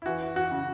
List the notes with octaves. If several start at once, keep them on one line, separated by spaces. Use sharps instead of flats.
E4
E3 F#4
F#4
C#3